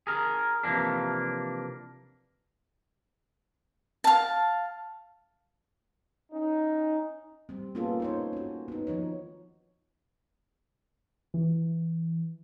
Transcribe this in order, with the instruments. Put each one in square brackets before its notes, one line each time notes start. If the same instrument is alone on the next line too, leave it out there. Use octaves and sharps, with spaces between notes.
[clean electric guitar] G#4 A#4
C3 E3 F3 A#3 D4
[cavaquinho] F5 A5
[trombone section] C#4 D#4
[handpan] G3 C4
A#3 B3 C#4 F4 G#4 A4
D#4 C5 C#5
C#4 F#4
B3 D#4
D#3 F3 D#4 C#5
[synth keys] E3